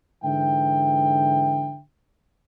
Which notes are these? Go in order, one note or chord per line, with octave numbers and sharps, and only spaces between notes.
G#2 D3 E3 E5 G5